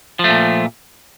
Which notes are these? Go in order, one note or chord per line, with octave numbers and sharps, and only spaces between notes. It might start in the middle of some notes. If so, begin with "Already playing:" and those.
A#2 F3 A3